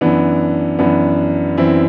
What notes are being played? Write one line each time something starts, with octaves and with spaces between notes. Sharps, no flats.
F#2 E3 B3 D4
F#2 E3 B3 D4
F#2 E3 C4 E4